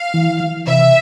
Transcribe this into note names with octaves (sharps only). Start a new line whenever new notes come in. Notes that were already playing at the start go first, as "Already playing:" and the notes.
Already playing: F5
E3
E3
C3 E5